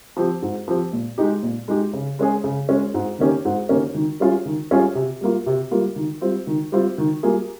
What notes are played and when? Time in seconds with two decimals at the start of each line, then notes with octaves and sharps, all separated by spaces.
0.17 F3 C4 G4
0.42 G#2
0.68 F3 C4 G4
0.93 A#2
1.18 G#3 D#4 G4
1.43 A#2
1.68 G#3 D#4 G4
1.93 C#3
2.19 G#3 C#4 G#4
2.44 C#3
2.69 G#3 C#4 G#4
2.94 G#2
3.19 D#3 A#3 C#4 G4
3.45 G#2
3.69 D#3 A#3 C#4 G4
3.95 D#3
4.20 G3 C#4 F4 G#4
4.46 D#3
4.71 G3 C#4 F4 G#4
4.95 C3
5.21 G3 A#3 F4
5.46 C3
5.71 G3 A#3 F4
5.96 D#3
6.21 G3 C4 F4
6.47 D#3
6.72 G3 C4 F4
6.98 D#3
7.23 G3 A#3 F4 G#4